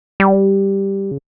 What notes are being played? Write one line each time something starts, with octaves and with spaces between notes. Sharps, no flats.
G3
C#3